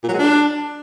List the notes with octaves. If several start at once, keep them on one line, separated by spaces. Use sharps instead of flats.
A#2
F#3
G#3
D4